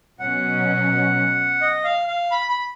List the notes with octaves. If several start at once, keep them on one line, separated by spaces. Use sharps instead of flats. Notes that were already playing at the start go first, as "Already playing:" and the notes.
B2 F#3 C#4 F#5
D#5
F5
F5
B5
B5